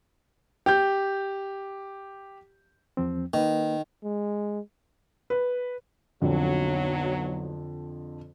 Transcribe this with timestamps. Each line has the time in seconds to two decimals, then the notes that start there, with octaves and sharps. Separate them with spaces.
0.66 G4 G6
2.97 E2 F3 C4
3.34 D#3 A#3 B4
4.04 G#3
5.30 B4
6.22 B1 F2 D3 F#3